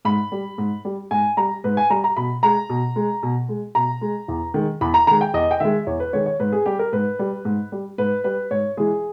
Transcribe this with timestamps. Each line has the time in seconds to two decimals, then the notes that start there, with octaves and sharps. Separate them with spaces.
0.05 G#2 B5
0.32 G3
0.58 G#2
0.85 G3
1.11 G#2 G#5
1.37 G3 A#5
1.64 G#2 B4
1.77 G#5
1.90 G3 A#5
2.04 A#5
2.17 B2 B5
2.43 G#3 A#5
2.69 B2
2.96 G#3
3.23 B2
3.49 G#3
3.75 B2 A#5
4.01 G#3
4.28 E2
4.54 D#3 G#3
4.81 E2 B5
4.94 A#5
5.07 D#3 G#3 A#5
5.21 G5
5.34 E2 D#5
5.51 G5
5.60 D#3 G#3 E5
5.87 E2 C#5
6.00 B4
6.13 D#3 G#3 C#5
6.26 C#5
6.40 G#2 B4
6.52 G#4
6.66 G3 G4
6.79 A#4
6.93 G#2 B4
7.19 G3
7.45 G#2
7.72 G3
7.98 G#2 B4
8.24 G3 B4
8.51 G#2 C#5
8.77 E3 G#3 G#4